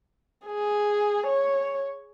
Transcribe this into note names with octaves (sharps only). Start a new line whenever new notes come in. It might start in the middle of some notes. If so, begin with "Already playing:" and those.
G#4
C#5